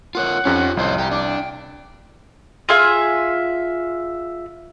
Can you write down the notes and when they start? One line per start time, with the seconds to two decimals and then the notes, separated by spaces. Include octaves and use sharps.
0.15 F4 A#4 C#5 F#5
0.45 F2 C#4 F4 G4
0.77 C2 F2 C5 C#5 D#5
0.98 G4 A#5
1.11 D4 D6
1.25 G5
2.69 F4 G#4 E5 G#5